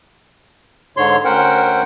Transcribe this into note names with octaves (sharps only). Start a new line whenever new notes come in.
G#2 D3 C#5 C6
D2 C#4 A#4 C5 F#5 G5